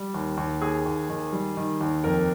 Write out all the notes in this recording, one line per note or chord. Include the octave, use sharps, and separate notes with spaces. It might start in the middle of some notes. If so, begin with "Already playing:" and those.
Already playing: G3
D#2
D#2
D#2 G#4
D#2
D#3
G3
D#3
D#2
F2 A#4